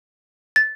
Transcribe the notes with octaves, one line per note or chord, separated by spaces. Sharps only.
A6